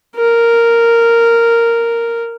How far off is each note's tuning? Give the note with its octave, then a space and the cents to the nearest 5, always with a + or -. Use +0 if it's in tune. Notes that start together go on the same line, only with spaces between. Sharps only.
A#4 -5